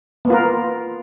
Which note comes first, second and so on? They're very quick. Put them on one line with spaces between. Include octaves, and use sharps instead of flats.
B3 A#3 F4 A#4